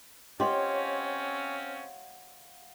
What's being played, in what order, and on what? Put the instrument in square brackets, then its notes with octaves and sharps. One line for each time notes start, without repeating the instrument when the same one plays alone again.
[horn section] C4 C#4 [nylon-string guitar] G4 [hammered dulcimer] C#5 F5 F#5 [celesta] D#5 C6